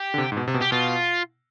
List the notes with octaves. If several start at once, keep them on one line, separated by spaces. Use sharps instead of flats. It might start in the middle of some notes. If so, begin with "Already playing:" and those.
Already playing: G4
D3
C3
G#2
B2
C3
B2
G4
B2 F4